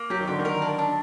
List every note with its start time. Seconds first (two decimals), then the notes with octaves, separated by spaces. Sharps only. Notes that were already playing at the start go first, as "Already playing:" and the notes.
Already playing: A#3
0.10 F#3 G4
0.20 D#3
0.27 D3 G4
0.39 D#3
0.45 A#4
0.62 D4
0.79 D4